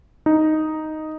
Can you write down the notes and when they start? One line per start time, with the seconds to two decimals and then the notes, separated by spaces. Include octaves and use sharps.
0.26 D#4